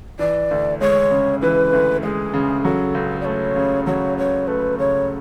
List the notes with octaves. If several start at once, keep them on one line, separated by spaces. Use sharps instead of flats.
E3 D5
D2
G#3 C#5
C#3
E3 B4
D2
G#3 G#4
C#3
F#3 A4
C#2
D5
A3 C#5
C#3
F#3 C#5
C#2 C#5
A3 B4
C#3 C#5